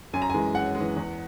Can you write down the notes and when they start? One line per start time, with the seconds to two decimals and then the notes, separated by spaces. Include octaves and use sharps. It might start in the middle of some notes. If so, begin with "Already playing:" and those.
0.13 F#2 G#5
0.22 A#5
0.30 E3 G#3 G#5
0.54 F#2 F#5
0.75 G#3
0.80 E3
0.96 E2